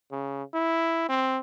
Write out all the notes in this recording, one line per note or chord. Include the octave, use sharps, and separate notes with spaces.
C#3
E4
C4